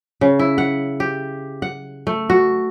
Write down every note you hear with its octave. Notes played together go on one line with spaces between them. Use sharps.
C#3
E4
F#5
G4
F#5
A3
F#4